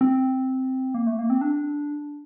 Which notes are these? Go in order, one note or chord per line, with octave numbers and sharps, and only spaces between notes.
C4
A#3
A3
A#3
C4
D4